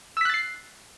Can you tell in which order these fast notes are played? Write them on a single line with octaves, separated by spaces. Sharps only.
E6 B6 F#6 A6 C7